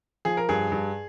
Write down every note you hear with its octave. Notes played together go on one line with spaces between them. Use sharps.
F3 G#4
A#4
G2 G#4
G2